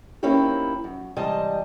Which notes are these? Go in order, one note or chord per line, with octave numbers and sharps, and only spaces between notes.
A#3 C4 C#4 D#4 E4 G4
F#2
G#2 C3 E3 G3 D#5 A5